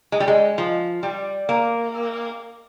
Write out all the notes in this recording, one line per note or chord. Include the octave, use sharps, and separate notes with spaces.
G#3
G3
G#3
F3
G3
A#3